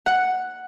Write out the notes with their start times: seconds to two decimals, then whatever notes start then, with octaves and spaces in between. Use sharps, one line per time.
0.06 F#5